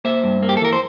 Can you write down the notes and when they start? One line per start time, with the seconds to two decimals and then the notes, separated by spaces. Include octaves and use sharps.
0.05 A#3 C5 E5
0.24 G2
0.43 A#3
0.49 G4
0.57 A4
0.61 E3 A#4
0.73 C5